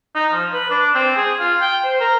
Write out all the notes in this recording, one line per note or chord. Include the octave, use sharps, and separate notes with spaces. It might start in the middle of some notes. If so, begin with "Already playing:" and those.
D#4
F3
B4
D4
C4
G#4
F4
G5
C5
A#4